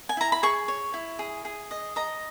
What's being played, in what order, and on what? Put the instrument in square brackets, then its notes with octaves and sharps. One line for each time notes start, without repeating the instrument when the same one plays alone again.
[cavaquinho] G#5
E4 A#5
B5
G#4 C#6
C#5
E4
G#4
G#4
D#5
D#5 A#5